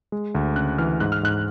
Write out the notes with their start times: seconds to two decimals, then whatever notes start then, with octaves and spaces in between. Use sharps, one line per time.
0.12 G#3
0.35 D2
0.56 C#3 F#6
0.78 E3 F6
1.00 G#2 F#6
1.12 F6
1.23 G#2 F#6